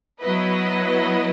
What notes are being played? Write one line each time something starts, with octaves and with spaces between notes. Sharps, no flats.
F#3 B3 E4 B4 D#5